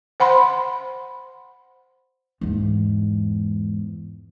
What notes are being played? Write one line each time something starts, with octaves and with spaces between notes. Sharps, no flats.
C5 F#5 B5 C6
E2 G#2